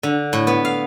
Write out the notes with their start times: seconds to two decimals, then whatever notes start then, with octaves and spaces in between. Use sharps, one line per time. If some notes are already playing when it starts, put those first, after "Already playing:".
0.03 D3
0.33 A2
0.47 B3
0.65 F5